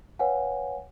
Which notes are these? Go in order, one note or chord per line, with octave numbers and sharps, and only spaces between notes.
B4 C#5 F5 F#5 G#5